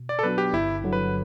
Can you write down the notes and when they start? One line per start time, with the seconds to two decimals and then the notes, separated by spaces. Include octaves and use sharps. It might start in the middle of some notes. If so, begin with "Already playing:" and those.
Already playing: B2
0.09 D5
0.19 A4
0.23 F#3 B3 D4 F#4 B4
0.38 G4
0.53 G1 E4
0.83 G2 D3 F#3
0.93 B4